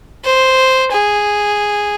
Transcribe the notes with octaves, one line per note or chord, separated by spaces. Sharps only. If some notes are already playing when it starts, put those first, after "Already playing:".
C5
G#4